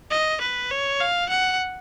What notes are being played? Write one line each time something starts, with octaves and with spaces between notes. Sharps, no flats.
D#5
B4
C#5
F5
F#5